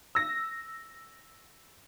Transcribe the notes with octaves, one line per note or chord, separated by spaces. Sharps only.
E6 A#6